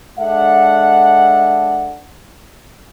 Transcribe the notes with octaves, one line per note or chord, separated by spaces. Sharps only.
G#3 D4 A4 E5 F#5